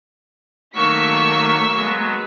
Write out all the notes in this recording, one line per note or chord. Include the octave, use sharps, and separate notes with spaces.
D#3 F#3 A3 A#3 C#6 E6 B6
F#3 G#3 B3